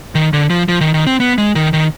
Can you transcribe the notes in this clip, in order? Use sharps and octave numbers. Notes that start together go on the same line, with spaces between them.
D#3
D3
F3
F3
D#3
D#3
C4
B3
G#3
D#3
D#3